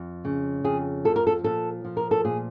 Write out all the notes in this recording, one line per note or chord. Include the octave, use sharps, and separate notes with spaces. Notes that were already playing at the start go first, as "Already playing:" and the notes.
Already playing: F2
C#3
F2 G#4
F3 A4
A#4
A4
A#2 A4
F3
A#4
A4
A#2 G#4